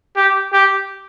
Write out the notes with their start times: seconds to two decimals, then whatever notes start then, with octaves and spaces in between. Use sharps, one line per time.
0.16 G4
0.53 G4